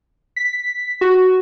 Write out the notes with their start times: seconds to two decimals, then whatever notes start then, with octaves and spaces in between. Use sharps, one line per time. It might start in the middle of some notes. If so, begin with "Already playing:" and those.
0.36 B6
1.01 F#4